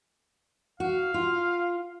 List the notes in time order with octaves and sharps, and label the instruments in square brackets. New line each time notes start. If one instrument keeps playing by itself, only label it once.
[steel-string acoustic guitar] F#4 [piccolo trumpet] F5
[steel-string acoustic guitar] F4